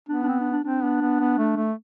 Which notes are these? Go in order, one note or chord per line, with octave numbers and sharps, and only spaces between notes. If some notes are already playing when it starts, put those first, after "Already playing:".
B3 D4
D4
C4
D4
D4
C4 D4
B3 D4
B3
B3
A3
A3